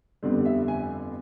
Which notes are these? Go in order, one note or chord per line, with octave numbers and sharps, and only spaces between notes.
G1 F2 D3 G3
E5
G#5